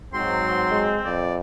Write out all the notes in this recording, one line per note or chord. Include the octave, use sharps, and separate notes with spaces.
G#2 F#3 C4 C6
G#3
F2 D5